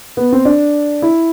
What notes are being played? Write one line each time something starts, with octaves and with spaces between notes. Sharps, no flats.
B3
C4
D4
E4